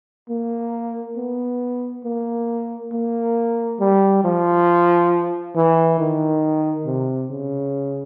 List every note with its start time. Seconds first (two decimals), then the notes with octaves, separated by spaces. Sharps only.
0.29 A#3
1.17 B3
2.04 A#3
2.92 A#3
3.80 G3
4.24 F3
5.56 E3
5.99 D#3
6.86 C3
7.31 C#3